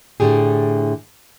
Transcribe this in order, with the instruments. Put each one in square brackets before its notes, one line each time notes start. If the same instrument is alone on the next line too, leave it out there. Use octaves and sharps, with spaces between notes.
[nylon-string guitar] A2 D3 G4 G#4